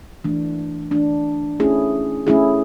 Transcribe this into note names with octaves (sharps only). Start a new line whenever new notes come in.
E3 A3 D4
E3 A3 D4
A3 C#4 E4 G#4
A3 C#4 E4 G#4